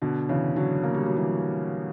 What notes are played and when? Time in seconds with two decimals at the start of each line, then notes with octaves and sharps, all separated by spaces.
0.02 B2 D3
0.29 C#3 E3
0.56 D3 F#3
0.83 A#3
0.94 G3
1.06 F#3
1.16 E3 G3